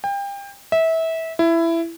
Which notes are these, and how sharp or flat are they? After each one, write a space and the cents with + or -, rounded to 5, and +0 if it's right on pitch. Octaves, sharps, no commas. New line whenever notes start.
G5 +30
E5 -25
E4 +15